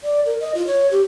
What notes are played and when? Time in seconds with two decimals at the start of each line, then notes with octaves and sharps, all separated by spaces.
0.03 D5
0.26 A#4
0.41 D#5
0.55 F4
0.67 C#5
0.91 G4